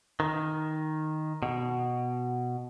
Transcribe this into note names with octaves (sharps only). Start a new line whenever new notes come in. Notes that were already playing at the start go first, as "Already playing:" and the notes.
D#3
B2